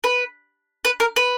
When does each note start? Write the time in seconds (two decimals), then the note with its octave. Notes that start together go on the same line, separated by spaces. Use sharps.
0.04 B4
0.85 B4
1.00 A#4
1.16 B4